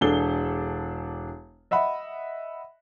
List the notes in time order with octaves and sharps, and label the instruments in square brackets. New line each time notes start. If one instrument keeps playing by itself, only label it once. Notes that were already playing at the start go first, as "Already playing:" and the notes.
[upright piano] E1 D4 G#4 A4 G7
D#5 E5 F#5 B5